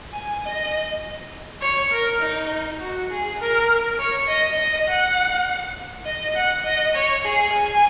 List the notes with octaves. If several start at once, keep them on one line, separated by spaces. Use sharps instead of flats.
G#5
D#5
C#5
A#4
D#4
F#4
G#4
A#4
C#5
D#5
D#5
F#5
D#5
F#5
D#5
C#5
G#4
G#5